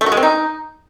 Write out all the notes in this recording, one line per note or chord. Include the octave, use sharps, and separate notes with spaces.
A3
F#4
G#3
C4
D#4